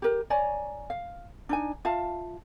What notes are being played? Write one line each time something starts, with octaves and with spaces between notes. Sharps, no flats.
G4 A#4
C#5 D5 G#5 A#5
F5
D4 D#4 G#5
F4 E5 F5 A5